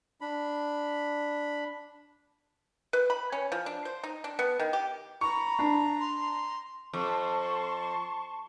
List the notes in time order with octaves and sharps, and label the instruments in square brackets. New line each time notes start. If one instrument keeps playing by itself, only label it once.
[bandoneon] D4 B5
[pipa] B4
B5
C#4
F3
D4
C5
D#4
D4
B3
D#3
G4
[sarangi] A#5 [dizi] B5 [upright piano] C#6
[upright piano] D4
[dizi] C6
[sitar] F2 [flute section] A5 C6 C#6